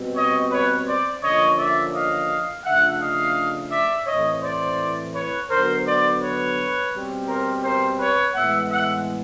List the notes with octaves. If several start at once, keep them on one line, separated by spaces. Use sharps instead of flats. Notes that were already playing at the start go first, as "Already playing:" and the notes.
Already playing: B2 G3 C4
C#5 D#5
B4 C#5
C5 D5
D3 F3 A#3 C#4 C#5 D#5
D5 E5
D#5 F5
C#3 F3 A3 D4 E5 F#5
D#5 F5
D5 E5
A2 E3 A3 C4 C#5 D#5
C5 D5
B4 C#5
D3 F#3 B3 A#4 C5
C5 D5
B4 C#5
B2 G3 C4
A#4 C5
A#4 C5
B4 C#5
A2 E3 G#3 B3 E5 F#5
E5 F#5